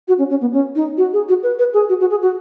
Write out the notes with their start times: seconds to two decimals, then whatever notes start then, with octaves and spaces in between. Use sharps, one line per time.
0.08 F#4
0.19 C#4
0.30 C#4
0.41 B3
0.53 C#4
0.75 D#4
0.97 F#4
1.13 G#4
1.29 F#4
1.43 B4
1.59 B4
1.74 G#4
1.89 F#4
2.00 F#4
2.11 G#4
2.22 F#4